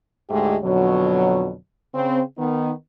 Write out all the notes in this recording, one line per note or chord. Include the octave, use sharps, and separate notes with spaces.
D2 G#2 G#3 A3 G4
F2 B2 D3 F#3
C#3 C4
D#3 B3 D#4